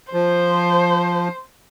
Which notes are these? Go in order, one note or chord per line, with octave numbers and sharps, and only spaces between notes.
F3 C5